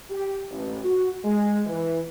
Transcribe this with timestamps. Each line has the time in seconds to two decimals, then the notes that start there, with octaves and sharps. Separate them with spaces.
0.10 G4
0.51 A1
0.84 F#4
1.24 G#3
1.66 E3